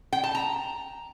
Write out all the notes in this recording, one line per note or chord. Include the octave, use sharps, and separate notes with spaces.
G5
A5
A#5